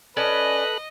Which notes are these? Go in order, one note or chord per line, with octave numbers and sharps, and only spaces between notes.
C#4 A4 B4 D5 D#5 A5 B5 F#6